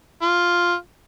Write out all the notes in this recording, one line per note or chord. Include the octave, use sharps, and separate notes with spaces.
F4